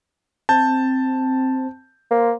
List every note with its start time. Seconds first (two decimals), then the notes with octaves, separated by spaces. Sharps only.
0.49 C4 A5 G6
2.11 A#3 C5